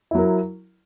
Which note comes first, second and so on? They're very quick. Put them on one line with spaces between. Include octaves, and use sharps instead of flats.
E4 F#3 A#4